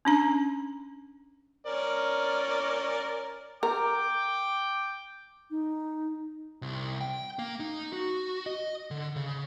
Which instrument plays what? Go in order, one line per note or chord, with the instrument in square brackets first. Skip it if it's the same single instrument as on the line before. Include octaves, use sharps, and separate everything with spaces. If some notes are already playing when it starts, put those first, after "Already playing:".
[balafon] C#4 D4 A#5
[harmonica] C#4 A#4 D5
[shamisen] A#4 [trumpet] G5 [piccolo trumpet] D6
[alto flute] D#4
[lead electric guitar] C2
G5
A#3
D#4
F#4
D#5
D3
C#3